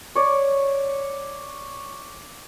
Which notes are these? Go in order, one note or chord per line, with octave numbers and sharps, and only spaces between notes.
C#5 D5